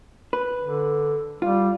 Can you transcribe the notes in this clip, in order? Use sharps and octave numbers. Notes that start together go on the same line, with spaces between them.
B4
D3
G3 F4